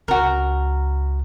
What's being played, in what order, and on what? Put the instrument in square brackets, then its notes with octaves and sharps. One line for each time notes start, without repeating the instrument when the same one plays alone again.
[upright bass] C#2 [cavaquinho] F#4 A#4